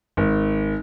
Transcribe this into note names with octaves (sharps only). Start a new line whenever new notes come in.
G#1